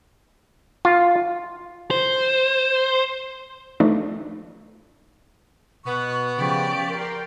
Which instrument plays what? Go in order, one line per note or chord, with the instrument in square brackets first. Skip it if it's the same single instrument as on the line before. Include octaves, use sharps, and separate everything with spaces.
[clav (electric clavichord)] F4
[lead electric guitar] C5
[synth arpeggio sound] E3 F3 A3 D4 D#4
[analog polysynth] B2 F#6 [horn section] B3 [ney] C#6
[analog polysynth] C#3 F3 [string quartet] G4 D5
[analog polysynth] A#4 G5 C6